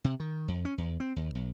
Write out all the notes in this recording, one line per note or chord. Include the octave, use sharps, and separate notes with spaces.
C3
D#3
F2
C#4
E2
C4
D#2
B1